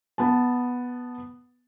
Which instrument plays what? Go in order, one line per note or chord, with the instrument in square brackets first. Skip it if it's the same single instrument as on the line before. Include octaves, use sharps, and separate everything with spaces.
[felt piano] B3 A5